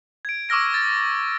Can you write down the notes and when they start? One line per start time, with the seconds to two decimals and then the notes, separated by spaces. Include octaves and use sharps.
0.25 G#6 D7
0.49 C#6 D6 E6 F6 A#6 D7
0.74 A6